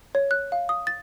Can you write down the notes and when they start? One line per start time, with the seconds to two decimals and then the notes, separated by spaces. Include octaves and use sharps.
0.15 C#5
0.31 F#6
0.52 F5
0.69 D#6
0.87 A6